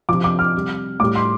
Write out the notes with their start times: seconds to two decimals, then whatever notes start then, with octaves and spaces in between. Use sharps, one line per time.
0.09 C3 F3 D6
0.24 D6
0.39 F6
0.54 C3 G3
1.00 A2 G3 D6
1.15 C6